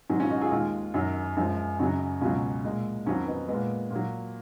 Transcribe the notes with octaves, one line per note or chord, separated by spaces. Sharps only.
G#2 D#3 F#3 C#4
C#4 F4
D#4 F#4
F4 G#4
D#2 D#3 G#3 F4 G#4
F#2 D#3 F#3
F#2 F3 G#3
F#2 C#3 F#3 D#4 F#4
C#2 B2 F#3 C#4 F4
A#2 G#3
F2 D#3 F#3 C#4 F4
B3 D#4
A#2 G#3 B3
A#2 F#3